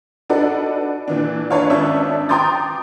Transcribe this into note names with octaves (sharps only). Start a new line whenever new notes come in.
D4 D#4 F#4 A4 B4 D5
A#2 E3 D4
D4 B4 C#5 F5
G#1 C#4 D4 E5 A5
G5 A#5 C6 D6 D#6 A6